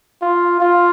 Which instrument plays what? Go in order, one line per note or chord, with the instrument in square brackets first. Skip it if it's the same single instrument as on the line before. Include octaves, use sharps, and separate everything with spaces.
[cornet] F4
F4